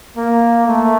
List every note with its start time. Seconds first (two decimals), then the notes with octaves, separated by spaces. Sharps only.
0.17 A#3
0.66 A3